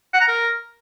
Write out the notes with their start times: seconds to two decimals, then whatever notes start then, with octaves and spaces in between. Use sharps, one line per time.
0.14 F#5
0.21 A#5
0.28 A#4